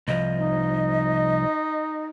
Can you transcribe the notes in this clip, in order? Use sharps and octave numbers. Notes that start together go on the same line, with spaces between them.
C2 F3 D#5
D#4